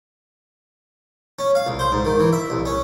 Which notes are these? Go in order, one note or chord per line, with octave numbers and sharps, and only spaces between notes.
C#4
F5
C2
C5
G#2
D#3
E3
E5
C2
C#4